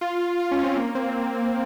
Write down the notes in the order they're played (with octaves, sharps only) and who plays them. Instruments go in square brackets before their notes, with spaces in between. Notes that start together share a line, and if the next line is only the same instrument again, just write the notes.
[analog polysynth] F4
F4
C#4
C4
A#3
C4